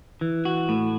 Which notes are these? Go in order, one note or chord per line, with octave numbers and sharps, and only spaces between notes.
E3
F#4
A2